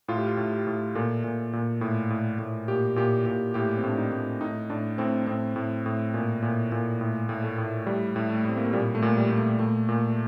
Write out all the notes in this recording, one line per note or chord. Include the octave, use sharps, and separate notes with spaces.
A2 F4
G4
F4
A2
G4
A2
A#2 A4
A#2
A#2
A2
A2
A2
A#2 G4
A#2 G4
A#2 G4
A2 G4
C4
A2 D4
D#4
A2
A2 D#4
A2 D4
A2 C4
A2 C4
A2
A2
A#2
A#2
A#2
A2
A2
A3
A2
A2 G3
A2
A3
A2 C4
A#3
A3
A#2 G3
A3
A#2
G3
A#2
A3
A#2 A3
A#2